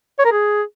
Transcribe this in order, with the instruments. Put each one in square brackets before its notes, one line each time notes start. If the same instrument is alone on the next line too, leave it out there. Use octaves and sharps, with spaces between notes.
[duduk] C#5
A#4
G#4